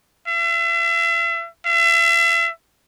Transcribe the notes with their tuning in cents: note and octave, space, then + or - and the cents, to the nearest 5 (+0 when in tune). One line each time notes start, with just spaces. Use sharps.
E5 +40
E5 +40